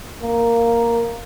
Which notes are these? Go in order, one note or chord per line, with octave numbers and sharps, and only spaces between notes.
A#3